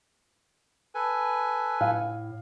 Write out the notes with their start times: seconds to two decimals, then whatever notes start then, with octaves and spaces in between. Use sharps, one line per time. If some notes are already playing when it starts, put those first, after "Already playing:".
0.95 A4 B4 G#5
1.81 A2 F5